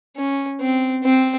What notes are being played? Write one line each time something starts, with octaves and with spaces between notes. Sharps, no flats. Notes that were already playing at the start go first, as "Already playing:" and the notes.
C#4
C4
C4